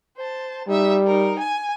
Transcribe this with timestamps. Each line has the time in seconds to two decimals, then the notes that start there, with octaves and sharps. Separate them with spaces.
0.17 C5 A5
0.68 G3 D#4 E5
1.06 D#4 A#4
1.39 G#5